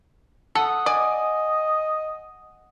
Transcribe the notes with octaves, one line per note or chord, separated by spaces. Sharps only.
A4 F#5 D#6
D5 D#5 G#5